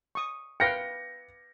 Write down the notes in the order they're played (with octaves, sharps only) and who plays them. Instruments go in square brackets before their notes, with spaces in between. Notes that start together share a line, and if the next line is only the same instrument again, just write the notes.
[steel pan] C#6 D#6
[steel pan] B4 F5 G5 [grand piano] A#6 C#7